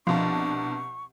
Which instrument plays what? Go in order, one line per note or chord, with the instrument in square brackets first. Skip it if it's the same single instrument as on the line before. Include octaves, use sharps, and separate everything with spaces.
[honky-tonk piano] C2 B2 A5 [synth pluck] F3 [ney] D4 [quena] C#6